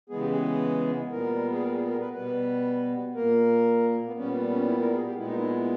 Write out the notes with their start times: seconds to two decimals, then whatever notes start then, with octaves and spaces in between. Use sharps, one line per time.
0.10 C#3 E3 G#3 B3 G#4
0.20 G4
0.31 G#4
1.11 A#2 G3 B3 A#4
1.53 G#4
1.62 A#4
1.75 G#4
1.88 A#4
2.01 B4
2.13 B2 G3 B3 B4
3.15 A#2 A#3 A#4
4.06 B3
4.16 A#2 G3 B3 C#4
4.50 C#4
4.67 E4
4.80 A#4
4.93 G#4
5.05 G4
5.18 A#2 G#3 B3 E4
5.27 D#4
5.35 E4